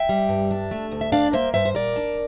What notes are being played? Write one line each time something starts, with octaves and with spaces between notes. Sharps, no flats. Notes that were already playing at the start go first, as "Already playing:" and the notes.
Already playing: E5 G5
G3
G2
D4
A3
D2
E5
D4 D5 F5
A#3 C5 E5
G2 C5 E5
C5
A#2 A#4 D5
D4